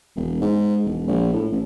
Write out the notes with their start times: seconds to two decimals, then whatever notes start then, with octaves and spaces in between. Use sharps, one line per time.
0.16 E1
0.41 G#2
0.84 E1
1.07 A#1
1.33 A2
1.52 A1